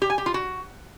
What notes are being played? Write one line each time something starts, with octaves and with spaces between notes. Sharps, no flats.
G4
G#5
G4
F4
F#4